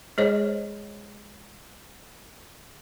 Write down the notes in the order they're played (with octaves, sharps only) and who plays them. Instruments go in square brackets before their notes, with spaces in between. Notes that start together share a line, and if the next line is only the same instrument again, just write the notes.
[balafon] G#3 G#4 C5 C#5 D#5